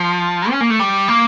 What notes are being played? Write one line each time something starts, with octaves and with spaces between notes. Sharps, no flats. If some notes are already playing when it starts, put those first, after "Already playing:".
Already playing: F3
C#4
A#3
A3
G3
A#3